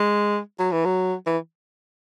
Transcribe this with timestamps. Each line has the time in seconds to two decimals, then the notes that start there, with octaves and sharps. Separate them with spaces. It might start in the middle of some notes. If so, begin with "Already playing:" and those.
Already playing: G#3
0.59 F#3
0.72 E3
0.85 F#3
1.26 E3